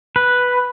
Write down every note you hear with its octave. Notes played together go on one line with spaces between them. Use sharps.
B4